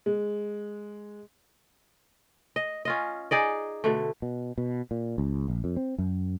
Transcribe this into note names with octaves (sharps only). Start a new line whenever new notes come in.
G#3
D#5
C#4 F4 D#5
D#4 G#4 D5 D#5
B2 D3 A3
B2
B2
A#2
C#2
A#1
F2
C4
F#2